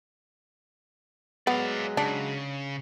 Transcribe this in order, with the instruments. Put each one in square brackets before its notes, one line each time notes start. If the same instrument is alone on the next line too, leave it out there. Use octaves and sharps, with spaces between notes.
[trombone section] F#3 G#3 [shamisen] B3 [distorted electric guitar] D5 F5
[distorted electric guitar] C#3 [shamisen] D4